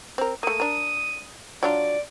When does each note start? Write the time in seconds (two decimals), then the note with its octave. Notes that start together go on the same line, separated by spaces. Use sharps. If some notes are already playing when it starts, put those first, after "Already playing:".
0.18 C4 A#4
0.43 A3 A#3 D#6
0.60 D4 A#4
1.63 F#3 D4 F4 D5